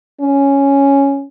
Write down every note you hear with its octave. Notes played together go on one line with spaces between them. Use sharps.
C#4